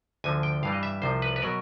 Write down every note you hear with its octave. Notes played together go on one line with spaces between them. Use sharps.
D2 D3 F3 G#5
G5
G2 E3 G3 F5
D#5
E5
C2 C3 F3 C5
B4
B4
B2 F#3 A#4